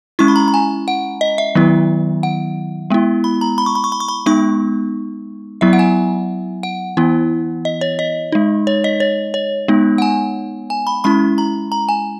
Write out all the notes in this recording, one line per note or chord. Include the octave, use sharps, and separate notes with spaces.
G#3 C#4 E4 C#6
B5
A#5
A#5
G#5
F#5
D#5
E5
D#3 F#3 B3 E4
F#5
G#3 B3 E4
B5
A#5
B5
C#6
B5
C#6
B5
C#6
B5
G#3 B3 D#4 C#6
F#3 B3 E4 E5
F#5
G#5
F#5
E3 B3 E4
D#5
C#5
D#5
G#3 D#4
C#5
D#5
C#5
C#5
G#3 B3 D#4
F#5
G#5
G#5
B5
G#3 C#4 E4 B5
A#5
A#5
G#5